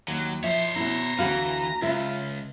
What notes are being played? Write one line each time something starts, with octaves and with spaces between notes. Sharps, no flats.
D#2 F#3
F3 C5 C#5 E5
B2 E4 A#5
D2 E3 F#4 F5
C#2 F4 E5